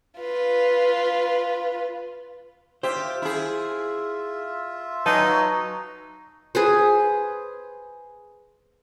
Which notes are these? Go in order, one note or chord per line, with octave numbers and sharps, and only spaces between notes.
F4 B4
F4 G4 C5 E5
E4 G#4
F#3 D#4 B4 G#5 A5
G#4 B4 C5